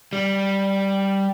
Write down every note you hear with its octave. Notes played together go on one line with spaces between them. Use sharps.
G3